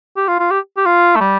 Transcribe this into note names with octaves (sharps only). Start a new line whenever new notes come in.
G4
F4
F4
G4
G4
F4
A3
G3